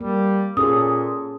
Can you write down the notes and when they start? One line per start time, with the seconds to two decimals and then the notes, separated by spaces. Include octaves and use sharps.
0.01 G3 A#3
0.57 A#2 C#4 G#4 A4 D#6